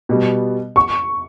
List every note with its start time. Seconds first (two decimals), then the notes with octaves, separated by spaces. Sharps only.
0.09 B2 G3 B3
0.76 C#6